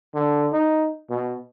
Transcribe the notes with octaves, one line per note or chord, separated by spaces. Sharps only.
D3
D#4
B2